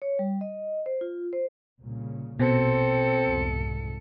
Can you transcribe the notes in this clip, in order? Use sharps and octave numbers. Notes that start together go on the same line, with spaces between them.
C#5
G3
D#5
C5
F4
C5
C2 A#2 C#3
A#1 B2 C4 A4 C#7
C2 F2 G#2